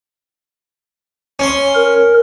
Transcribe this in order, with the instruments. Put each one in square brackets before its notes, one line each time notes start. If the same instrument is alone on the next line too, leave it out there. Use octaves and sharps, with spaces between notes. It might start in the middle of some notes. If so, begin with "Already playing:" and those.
[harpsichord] C#4 C6
[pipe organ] A#4